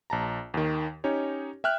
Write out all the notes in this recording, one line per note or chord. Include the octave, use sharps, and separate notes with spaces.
A#1 A5 A#5
D#2 D#3
C#4 D#4 G4 C#5
E5 G5 F6 F#6